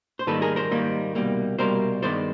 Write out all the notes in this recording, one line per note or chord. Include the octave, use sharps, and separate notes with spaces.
C5
G#2 D#3 G3 A#3 A4 B4
G#4 A#4
A#4 C5
G#2 D#3 G3 A#3
C2 B2 G3 A#3
C2 B2 G3 A#3 A#4 C5
G2 D#3 G#3 B3 C5 D5